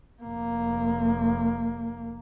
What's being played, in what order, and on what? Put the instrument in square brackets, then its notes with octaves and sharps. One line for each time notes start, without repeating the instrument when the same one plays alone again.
[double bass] F1 A#3